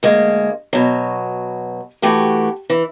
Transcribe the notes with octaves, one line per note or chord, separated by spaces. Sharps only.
D2 G#3 A#3
B2 F#3
E3 A3 F#4 G4
E3